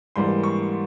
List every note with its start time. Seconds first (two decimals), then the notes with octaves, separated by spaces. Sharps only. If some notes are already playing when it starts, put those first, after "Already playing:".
0.16 G#2 E3 G3 A#3 C6
0.43 C#6